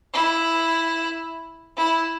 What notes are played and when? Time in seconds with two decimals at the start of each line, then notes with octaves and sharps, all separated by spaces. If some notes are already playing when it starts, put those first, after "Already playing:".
0.14 E4
1.77 E4